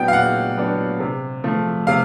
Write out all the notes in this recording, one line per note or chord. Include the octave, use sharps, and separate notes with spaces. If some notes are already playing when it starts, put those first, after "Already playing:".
Already playing: A#2 F#3 B3 D4 G5
F5
A#2 F#5
F#3 B3 D4
C3
F3 A3
C3 F5